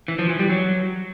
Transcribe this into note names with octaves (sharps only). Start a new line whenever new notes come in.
E3
F3
E3
G3
F#3